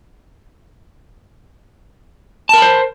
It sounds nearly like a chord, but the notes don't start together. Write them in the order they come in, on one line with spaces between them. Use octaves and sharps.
A5 A#4 B5 C5